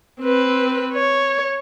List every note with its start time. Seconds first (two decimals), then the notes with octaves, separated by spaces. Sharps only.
0.21 C4 B4
0.93 C#5